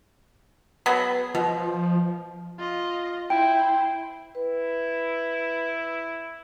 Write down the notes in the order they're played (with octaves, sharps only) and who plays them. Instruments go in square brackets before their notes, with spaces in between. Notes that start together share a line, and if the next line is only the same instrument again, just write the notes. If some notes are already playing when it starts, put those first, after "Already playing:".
[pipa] F#3 B3 G#4
[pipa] B2 [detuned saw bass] F3
[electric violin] F4 D#5
[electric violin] E4 C5 [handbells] G5
[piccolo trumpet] E4 [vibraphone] B4